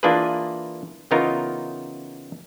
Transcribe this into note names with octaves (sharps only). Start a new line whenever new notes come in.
E3 A#3 D4 F4 G#4 B4
C#3 E3 B3 D#4 F4 A#4